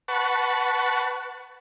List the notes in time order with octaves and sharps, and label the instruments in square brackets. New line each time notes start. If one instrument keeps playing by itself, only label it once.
[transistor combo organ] B4 F#5 A5 C#6